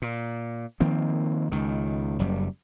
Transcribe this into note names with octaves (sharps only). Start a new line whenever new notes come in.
A#2
D#3 F3 A#3 C4
C#2 D#3
F#1 F#2 G3